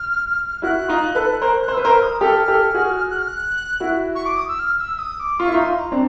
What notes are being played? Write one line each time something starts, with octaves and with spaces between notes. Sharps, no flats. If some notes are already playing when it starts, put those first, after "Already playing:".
Already playing: F6
E4 F#4 F#6
D#4 F4
A4 B4
A#4 C5 F#6
F#6
C5
E6
B4
A#4 C5 F6
D#6
G4 A4 F6
G4 A4
F#4 G#4
F#6
F6
F#6
E4 F#4
C#6
D6
D#6
E6
F6
E6
D#6
D6
F4 C#6
E4
D#4 F4
C6
A#5
C4 D4